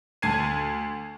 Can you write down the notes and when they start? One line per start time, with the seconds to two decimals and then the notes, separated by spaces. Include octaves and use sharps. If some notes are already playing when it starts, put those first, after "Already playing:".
0.22 D2 A5 G#6 C7 D#7